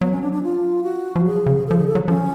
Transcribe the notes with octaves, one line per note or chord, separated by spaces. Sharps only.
F#3 B3
C#4
D4
D4
F4
F#4
F3
F#3 G#4
C#3
F3 A4
D3 G#4
A4
F#3
F3 C#4